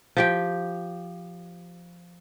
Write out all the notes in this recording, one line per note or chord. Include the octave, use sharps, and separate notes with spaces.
F3 G4 G5